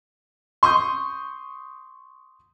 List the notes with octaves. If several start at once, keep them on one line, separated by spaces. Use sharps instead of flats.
C6 C#6 D#6 G6